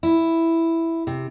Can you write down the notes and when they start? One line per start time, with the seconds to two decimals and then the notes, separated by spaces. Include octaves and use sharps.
0.03 E4
1.07 C3